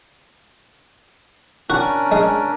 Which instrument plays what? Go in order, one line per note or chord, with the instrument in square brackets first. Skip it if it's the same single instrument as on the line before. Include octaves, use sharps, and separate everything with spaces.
[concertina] C#4 D4 A#4 [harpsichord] F#4
[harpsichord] G#3